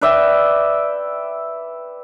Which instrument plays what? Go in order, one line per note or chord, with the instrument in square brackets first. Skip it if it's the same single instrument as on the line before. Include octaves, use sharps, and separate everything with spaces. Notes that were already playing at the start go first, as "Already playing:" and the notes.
[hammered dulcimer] B4 D5 E5 G5